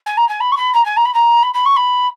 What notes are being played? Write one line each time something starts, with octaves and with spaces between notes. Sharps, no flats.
G#5
A#5
G#5
B5
C#6
B5
A#5
G#5
A#5
B5
A#5
B5
B5
C#6
B5